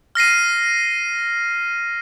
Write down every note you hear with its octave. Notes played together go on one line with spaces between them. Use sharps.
F6 A#6 C7 D#7